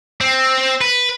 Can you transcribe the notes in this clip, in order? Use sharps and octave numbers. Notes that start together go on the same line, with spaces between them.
C4
B4